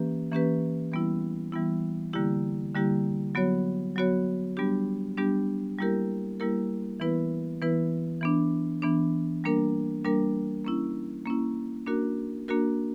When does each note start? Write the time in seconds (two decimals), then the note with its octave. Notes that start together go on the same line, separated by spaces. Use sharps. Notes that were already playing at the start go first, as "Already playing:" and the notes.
Already playing: E3 A#3 C#4 G4 B4
0.32 E3 A#3 C#4 G4 B4
0.92 E3 G3 B3 E4
1.52 E3 G3 B3 E4
2.13 D3 G3 A#3 E4 G4
2.75 D3 G3 A#3 E4 G4
3.35 F#3 B3 F#4 C#5
3.96 F#3 B3 F#4 C#5
4.57 G3 B3 D4 G4
5.18 G3 B3 D4 G4
5.78 G3 A#3 E4 G4 A#4
6.40 G3 A#3 E4 G4 A#4
7.00 E3 B3 E4 B4
7.62 E3 B3 E4 B4
8.21 E3 B3 D4
8.82 E3 B3 D4
9.44 G3 A#3 D4 A#4
10.05 G3 A#3 D4 A#4
10.65 A#3 C#4 E4
11.25 A#3 C#4 E4
11.86 A#3 D4 F#4 A#4
12.48 A#3 D4 F#4 A#4